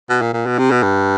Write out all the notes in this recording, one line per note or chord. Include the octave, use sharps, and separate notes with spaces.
B2
A#2
A#2
B2
C3
B2
G2